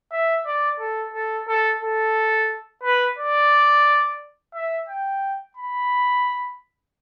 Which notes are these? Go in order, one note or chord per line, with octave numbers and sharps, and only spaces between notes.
E5
D5
A4
A4
A4
A4
B4
D5
E5
G5
B5